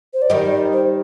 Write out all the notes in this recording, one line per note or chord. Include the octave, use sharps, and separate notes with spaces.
C5
D5
D#3 G3 D#5
D5
C5